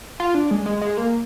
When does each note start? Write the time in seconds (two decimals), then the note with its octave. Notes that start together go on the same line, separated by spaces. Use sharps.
0.20 F4
0.34 D4
0.51 G#3
0.66 G#3
0.81 G#3
0.97 A#3